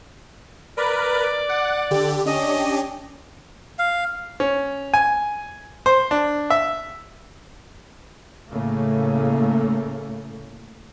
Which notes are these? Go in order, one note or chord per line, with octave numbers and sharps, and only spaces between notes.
A#4 B4 D5
F#5
D3 G4
C#4 D4 G4 D#5
F5
C#4
G#5
C5
D4
E5
A2 C#3 A3 A#3